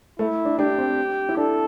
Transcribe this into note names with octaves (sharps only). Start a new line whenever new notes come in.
A3 E4
D4
D4 G4
C4
E4
D4 A4